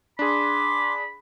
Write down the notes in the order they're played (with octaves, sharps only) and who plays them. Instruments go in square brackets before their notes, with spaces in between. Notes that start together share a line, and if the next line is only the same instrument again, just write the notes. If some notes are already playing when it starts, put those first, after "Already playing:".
[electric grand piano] D4 G#4 [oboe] B5 [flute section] C6 D6